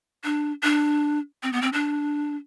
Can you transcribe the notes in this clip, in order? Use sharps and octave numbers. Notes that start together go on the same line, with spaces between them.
D4
D4
C4
B3
C4
D4